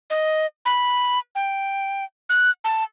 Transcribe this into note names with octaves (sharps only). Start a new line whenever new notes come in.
D#5
B5
G5
F#6
A5